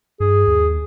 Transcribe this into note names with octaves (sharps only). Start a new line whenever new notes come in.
G2 G#4
D#2